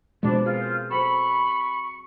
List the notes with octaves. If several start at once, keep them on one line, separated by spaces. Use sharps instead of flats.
B2 F3 G#3 B3 C4 D4
F4 G#4 A#4
C5
F#3 C4 A4 B5 C#6